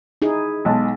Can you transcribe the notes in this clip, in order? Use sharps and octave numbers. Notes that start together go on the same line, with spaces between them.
D#4 E4 G#4
B1 G#3 A5